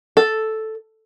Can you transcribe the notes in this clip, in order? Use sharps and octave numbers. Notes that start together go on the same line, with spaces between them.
A4